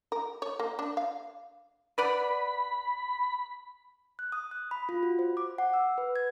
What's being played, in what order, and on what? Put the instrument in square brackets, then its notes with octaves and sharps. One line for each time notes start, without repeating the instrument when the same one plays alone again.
[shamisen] A#4
C#5
A#3
D4
F5
[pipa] B4 D5 F#5 [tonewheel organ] B5
[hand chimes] F#6
D#6
F#6
B5
F4
F#4
C5
D6
F#5
E6
B4
G#6